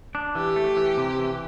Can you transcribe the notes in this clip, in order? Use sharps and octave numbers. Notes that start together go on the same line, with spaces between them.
D4
E3 G4
A3
E3
C3
E3